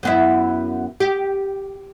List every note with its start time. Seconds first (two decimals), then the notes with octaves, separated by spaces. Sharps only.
0.03 F#2 B3 E4
1.00 G4